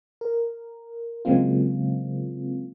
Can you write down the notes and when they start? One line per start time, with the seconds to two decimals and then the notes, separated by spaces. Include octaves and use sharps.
0.21 A#4
1.25 C#3 F#3 G#3 A#3 C4 F4